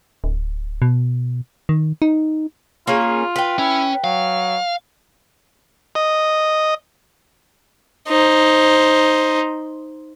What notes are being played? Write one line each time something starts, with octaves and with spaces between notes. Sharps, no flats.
D1
B2
D#3
D#4
A#3 C#4 F4 G#4
B4 G5
C#4 E4
F#3 F5
D#5
D#4 C5